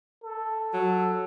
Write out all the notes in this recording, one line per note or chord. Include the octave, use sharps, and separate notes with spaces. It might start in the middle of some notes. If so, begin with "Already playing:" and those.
A4
F#3